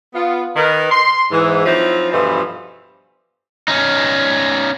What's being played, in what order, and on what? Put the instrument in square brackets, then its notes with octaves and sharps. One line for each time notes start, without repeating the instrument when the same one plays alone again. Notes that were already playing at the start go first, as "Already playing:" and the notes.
[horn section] B3 F4
D#3 A#4 B4
C6
G#2 E3
F3 F#3 C4 D#4 E4
G2 B2 E3 F3 A4 C6
[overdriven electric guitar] C#4 D#4